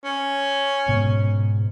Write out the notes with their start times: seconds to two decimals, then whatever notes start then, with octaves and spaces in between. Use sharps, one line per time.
0.04 C#4
0.88 G#2 B2